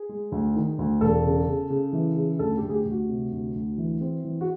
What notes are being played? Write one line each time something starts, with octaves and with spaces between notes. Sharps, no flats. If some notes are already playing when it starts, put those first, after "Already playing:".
Already playing: G#4
G#3
D2
D#3
D2
E1 A4
C#3
C#3
C#3
E3
C#3
D2 A4
G4
D2
G#4
G4
D2
F#4
C3
D2
D2
E3
C4
E3
F#4